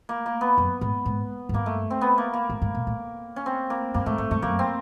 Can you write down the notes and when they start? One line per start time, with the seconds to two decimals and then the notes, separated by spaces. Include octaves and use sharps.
0.09 A#3
0.26 A#3
0.41 B3
0.58 F#2
0.81 G#2
1.06 G#2
1.49 G#2
1.54 G2 A#3
1.66 A3
1.90 C4
2.01 B3
2.18 A#3
2.33 A#3
2.50 G#2
2.62 G#2
2.74 A#2
2.87 A2
3.36 C#4
3.46 C4
3.70 A#3
3.94 G2 A#3
4.06 G#2 A3
4.18 G#2 A3
4.31 G2 A3
4.42 F#2 A#3
4.59 C4